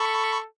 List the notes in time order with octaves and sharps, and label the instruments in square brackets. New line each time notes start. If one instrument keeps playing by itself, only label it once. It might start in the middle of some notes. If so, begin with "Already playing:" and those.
Already playing: [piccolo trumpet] A4 [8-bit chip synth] B5 C#6